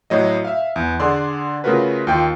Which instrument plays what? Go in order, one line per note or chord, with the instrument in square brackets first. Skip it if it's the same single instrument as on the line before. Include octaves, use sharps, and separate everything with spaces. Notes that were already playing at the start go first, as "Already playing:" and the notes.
[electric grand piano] A2 F#3 D#5
E5 F5
E2
D3 G#4 D5 F#5 C6
C#3 A3 F4 F#4 A#4 B4
D#2 F4 G5